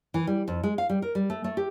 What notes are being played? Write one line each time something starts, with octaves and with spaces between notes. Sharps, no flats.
E3
G3
F2
G#3
F5
G3
A#4
G3
A3
A3
G4